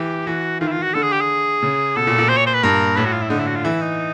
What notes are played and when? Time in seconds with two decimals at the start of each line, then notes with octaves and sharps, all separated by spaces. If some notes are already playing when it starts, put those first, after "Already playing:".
Already playing: E3 G4
0.27 E3 F#4
0.61 D#3 F4
0.68 E4
0.72 F4
0.77 D#3
0.83 F#4
0.94 D3 A4
1.03 G#4
1.12 G4
1.21 G#4
1.63 C#3
1.96 B2 A4
2.07 A#2
2.18 A#2
2.29 C5
2.37 C#5
2.46 C5
2.54 B4
2.63 G2 A#4
2.96 A2 B4
3.05 F#4
3.13 F4
3.22 E4
3.30 D3 D#4
3.39 E4
3.47 F#4
3.56 F4
3.65 E3 E4
3.81 D#4